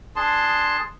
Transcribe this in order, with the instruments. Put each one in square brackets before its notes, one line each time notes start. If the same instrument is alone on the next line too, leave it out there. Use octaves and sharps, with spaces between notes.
[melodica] D4 G#4 A5 C6